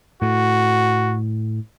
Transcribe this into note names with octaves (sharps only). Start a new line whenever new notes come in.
A2 F#4